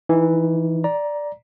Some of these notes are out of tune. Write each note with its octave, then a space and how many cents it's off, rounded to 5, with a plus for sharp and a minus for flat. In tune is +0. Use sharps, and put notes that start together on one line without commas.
E3 +0 D#4 +20
D5 +0 A#5 +15